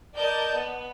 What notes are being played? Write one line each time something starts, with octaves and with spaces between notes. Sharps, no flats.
A#4 D5 D#5 A5 G6
B3